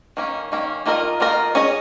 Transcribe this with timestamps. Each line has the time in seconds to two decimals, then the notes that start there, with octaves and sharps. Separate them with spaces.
0.17 D#3 A#3 C#4
0.52 D#3 A#3 C#4
0.86 D#3 A#3 F4 A#4 D#5
1.20 D#3 A#3 F4 A#4 D#5
1.55 C#4 G#4 D#5